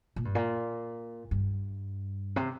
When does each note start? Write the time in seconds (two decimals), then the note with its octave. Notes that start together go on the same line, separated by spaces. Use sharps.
0.16 A#2
0.25 G2
0.35 A#2
1.31 G2
2.36 C3